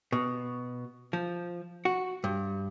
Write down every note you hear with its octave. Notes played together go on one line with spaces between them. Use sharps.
B2
F3
F#4
G2